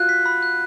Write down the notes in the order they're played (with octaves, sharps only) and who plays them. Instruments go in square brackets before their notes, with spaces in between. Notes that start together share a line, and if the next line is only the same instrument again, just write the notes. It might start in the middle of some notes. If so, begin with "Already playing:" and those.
Already playing: [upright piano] F4 F#4 [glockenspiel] F#6
[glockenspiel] B6
B5
F#6